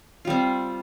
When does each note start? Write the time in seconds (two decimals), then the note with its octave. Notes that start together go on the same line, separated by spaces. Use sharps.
0.25 F4
0.27 G3
0.30 C4